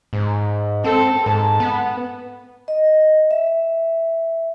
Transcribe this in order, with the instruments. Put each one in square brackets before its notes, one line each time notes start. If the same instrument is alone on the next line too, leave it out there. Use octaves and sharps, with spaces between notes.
[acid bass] G#2
[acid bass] C4 [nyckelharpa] A4
[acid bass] G#2 [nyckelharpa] A5
[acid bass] B3
[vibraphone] D#5
E5